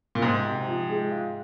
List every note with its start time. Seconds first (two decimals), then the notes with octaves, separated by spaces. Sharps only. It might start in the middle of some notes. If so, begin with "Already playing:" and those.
0.15 A#2
0.22 G#2 C3
0.45 C3
0.66 F3
0.89 G#3
1.12 F4